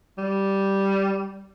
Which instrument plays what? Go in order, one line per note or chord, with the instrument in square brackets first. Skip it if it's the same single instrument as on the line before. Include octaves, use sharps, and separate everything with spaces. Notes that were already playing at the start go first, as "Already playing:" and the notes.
[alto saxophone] G3